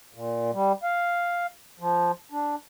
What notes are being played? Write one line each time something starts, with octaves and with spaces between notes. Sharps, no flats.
A#2
G3
F5
F3
D4